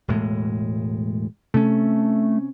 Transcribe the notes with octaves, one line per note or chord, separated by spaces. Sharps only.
E1 A2 G#3
C3 A3 C#4